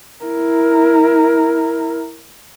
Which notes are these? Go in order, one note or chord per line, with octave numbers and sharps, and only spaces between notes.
E4 A#4